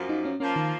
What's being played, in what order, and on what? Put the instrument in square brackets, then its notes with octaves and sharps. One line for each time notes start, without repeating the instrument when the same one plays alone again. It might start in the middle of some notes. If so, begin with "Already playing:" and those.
Already playing: [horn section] F#2 F3 A#3
[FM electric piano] D#4
C#4
[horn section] F3 A#3 F4 [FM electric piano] C#4
[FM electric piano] D#3